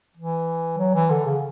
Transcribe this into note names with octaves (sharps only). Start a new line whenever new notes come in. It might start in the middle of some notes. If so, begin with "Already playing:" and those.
E3
F#3
E3
D3
C#3